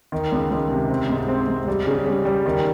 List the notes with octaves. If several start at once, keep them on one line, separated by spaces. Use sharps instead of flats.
D#3
C#2
C#2
C3
C4
G#2
C4
G#2
G3
C#3
G3
G3
D#3